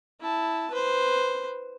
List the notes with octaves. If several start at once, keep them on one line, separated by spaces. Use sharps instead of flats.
E4 A5
B4 C5